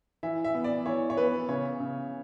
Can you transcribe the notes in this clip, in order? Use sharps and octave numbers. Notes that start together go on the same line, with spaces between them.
E3 E5
E5
B3
D5
E3 C#5
C#5
B3 B4
C#3 C#5
C#3